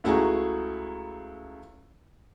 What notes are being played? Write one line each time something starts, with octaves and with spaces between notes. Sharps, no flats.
C#2 A3 E4 F#4 G#4 A#5